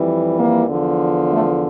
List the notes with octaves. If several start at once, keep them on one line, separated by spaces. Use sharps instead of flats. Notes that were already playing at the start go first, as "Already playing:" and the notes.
Already playing: F2 E3 G3
A#3
E2 D3 F3
A3